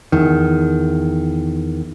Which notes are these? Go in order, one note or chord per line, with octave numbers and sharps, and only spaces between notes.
E2 D#3